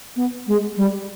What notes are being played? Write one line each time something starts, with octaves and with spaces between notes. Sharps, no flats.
B3
G#3
G3